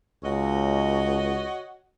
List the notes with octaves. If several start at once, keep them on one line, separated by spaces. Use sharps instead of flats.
C#2 F#4 C#5 D#5